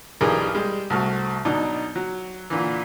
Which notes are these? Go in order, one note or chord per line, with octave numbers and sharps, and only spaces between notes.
B1 G2 E3 G3 G#4 A#4
G3 G#3
C2 A3 F#4 F6
B2 F#3 D4 D#4
F#3
A#2 D3 E3